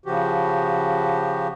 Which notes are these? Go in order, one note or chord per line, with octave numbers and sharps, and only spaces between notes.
C#3 F3 F#4 G4